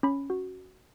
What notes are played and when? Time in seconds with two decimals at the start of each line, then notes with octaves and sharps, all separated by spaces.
0.03 C#4 B5
0.30 F#4